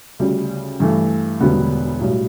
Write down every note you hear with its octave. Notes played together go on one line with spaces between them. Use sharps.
D2 C#3 G3
G2 E3 A3
E1 D2 D3 G3 B3
B1 A2 G3